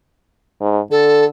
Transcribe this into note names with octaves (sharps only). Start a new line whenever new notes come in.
G#2
D3 A4